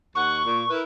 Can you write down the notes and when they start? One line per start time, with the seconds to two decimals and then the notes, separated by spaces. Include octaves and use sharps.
0.15 D#2 F#5 C#6
0.45 A#2
0.69 E4 A#4 B4